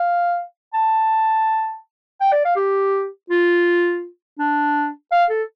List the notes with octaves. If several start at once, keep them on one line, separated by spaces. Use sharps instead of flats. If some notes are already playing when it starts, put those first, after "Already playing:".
Already playing: F5
A5
G5
D5
F5
G4
F4
D4
F5
A4